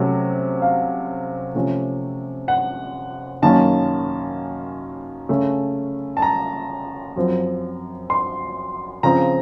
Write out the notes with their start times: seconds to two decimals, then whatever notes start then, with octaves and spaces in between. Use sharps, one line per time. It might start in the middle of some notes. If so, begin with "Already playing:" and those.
Already playing: C3 F#3 A3 C#4
0.62 F5
1.55 C3 F3 A3 C#4
2.48 F#5
3.42 F#2 D#3 A#3 C#4 A5
5.29 C#3 A3 C#4
6.17 A5
6.22 A#5
7.16 F#2 F3 C4
8.10 C6
9.03 C#3 F3 C4 A#5